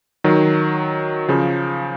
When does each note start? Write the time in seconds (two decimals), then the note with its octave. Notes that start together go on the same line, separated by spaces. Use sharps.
0.24 D#3 F#3
1.28 C#3 F3